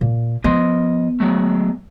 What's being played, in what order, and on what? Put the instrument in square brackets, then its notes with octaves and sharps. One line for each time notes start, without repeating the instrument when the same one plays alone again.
[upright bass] A#2
[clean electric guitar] F3 D#5 C6 [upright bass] B3
[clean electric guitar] F#3 G#3 A3